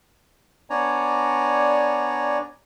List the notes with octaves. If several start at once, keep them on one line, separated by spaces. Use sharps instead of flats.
B3 D4 C#5 D5 G#5 A#5